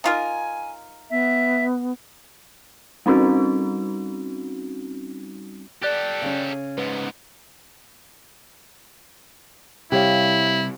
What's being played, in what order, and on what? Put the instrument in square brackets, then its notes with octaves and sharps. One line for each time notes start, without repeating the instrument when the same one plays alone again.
[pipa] D#4 F4 A#4 [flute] G#5
[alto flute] B3 [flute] E5
[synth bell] G3 C4 C#4 D#4 F#4
[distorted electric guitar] G4 A4 [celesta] D5 F#6 A6
[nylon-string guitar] C#3 C#4
[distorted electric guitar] G#2 B3 [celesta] B4
[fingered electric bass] C3 G3 [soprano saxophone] E4 [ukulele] G4 C#5 F5